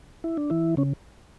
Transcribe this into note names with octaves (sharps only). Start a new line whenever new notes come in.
E4
D4
E3 E4
C#3 C#4